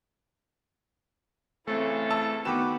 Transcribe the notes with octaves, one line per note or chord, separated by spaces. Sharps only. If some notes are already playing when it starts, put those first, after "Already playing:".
C#3 E3 A3 C4 A4
A5 E6
D#3 B3 F#4 B4 G5 D6 E7